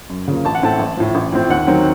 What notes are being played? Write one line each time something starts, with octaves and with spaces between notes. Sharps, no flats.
F#2
C#3 F3 A#3
A1 A5
F#5
A2 A3 C4 A5
A1
A2 F3
A1
A2 F3 C4
D#2 F#5
D#3 F#3 C4